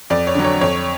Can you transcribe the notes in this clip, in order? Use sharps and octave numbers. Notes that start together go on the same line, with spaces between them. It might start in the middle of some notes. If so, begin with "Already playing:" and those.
F2 D5
C#5
D3 F#3
C#5
F2 C#5